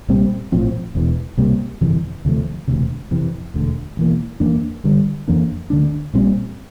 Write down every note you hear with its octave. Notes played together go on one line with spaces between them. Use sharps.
C2 A#2 G3 C4
A#1 A2 F3 C4
E1 E2 E3
C2 C3 G3 A#3
G1 F2 C3 E3
D2 C3 F3 A3
E1 D2 C3
F2 C3 E3
E1 D2 D3
E1 E2 E3 A#3
F2 E3 A#3 D4
G1 G2 D3 G3
F2 E3 A#3 D4
D2 D3 A3 D4
A#1 A#2 G3 C4